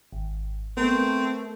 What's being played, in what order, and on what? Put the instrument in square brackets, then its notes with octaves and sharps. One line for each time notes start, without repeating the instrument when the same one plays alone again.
[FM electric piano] G#1
[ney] A3 [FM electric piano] B3 A#4 [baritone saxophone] C4